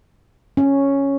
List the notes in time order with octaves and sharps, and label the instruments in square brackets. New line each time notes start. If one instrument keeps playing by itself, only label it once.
[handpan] C#4